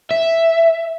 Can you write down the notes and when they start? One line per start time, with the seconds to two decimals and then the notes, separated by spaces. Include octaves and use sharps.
0.11 E5